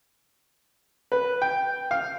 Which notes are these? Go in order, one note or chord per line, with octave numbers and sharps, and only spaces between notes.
B4
G5
F5